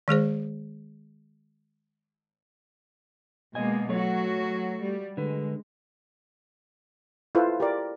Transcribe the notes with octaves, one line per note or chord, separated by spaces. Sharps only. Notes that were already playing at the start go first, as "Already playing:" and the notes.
D#3 G#3 G#4 C5
B2 G#3 A#3 D#5 G#5
F#3 A3 F#4 C#5
G3
D3 G#3 B4
E4 F4 A4 B4 C5
G4 A#4 D5